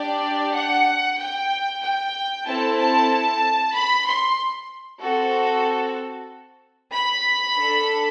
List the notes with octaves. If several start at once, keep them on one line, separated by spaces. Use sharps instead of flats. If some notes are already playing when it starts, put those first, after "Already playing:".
Already playing: D4 G4 D5
F#5
G5
G5
C4 E4 A4 A5
A5
B5
C6
C4 F#4 A4
B5
D4 A4